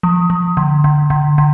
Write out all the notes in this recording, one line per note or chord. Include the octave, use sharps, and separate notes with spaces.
F3
F3
D3
D3
D3
D3